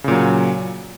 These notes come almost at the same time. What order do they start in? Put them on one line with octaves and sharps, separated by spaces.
C#3 A#2 F#3